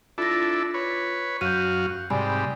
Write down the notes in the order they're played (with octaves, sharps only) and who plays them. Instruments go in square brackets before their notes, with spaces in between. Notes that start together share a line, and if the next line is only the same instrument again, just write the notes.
[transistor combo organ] D4 E4 A4 [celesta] F4 A#6
[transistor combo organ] B4 C#5
[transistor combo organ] F#2 F#4 F5 [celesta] G6 D#7
[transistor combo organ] G#2 C3 G3 [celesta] D5 G#5 B5